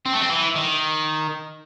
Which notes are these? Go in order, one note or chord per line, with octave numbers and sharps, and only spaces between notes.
C4
A3
C4
E3
D#3